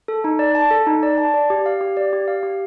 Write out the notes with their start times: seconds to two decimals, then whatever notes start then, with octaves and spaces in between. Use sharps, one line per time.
0.08 A4
0.24 D#4
0.39 D5
0.55 A5
0.71 A4
0.86 D#4
1.03 D5
1.18 A5
1.34 D5
1.50 G4
1.66 F5
1.81 G4
1.97 D5
2.13 G4
2.28 F5
2.43 G4